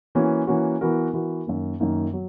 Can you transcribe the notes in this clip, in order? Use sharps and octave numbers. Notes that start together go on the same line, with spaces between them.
E3 A#3 C#4 F#4
E3 A#3 C#4 F#4
E3 B3 F#4 A#4
E3 B3 F#4 A#4
F#2 D#3 A#3
F#2 D#3 A#3
F#3